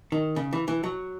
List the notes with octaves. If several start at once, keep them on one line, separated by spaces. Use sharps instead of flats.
D#3
C#3
E3
E3
F#3